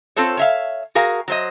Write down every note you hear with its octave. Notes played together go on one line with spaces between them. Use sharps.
C4 F4 A4 C5 C#5
C#5 E5 F5
F#4 G#4 A#4 F5
F#3 C5 D#5